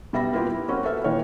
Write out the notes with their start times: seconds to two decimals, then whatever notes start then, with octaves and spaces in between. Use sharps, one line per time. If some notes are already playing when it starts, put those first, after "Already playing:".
0.13 B2 G3 E5 B5 A#6
0.33 A#3 B3 E4 F4 G4 A#4
0.46 E4
0.68 A#3 C4 C#4 F#4
0.84 A4 B4 E5 F6
1.04 A#2 D#3 E3 C#5 F5